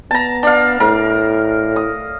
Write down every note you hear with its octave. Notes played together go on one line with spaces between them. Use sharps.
B3 A5 A#5
D4 F5
A2 A#4
D#6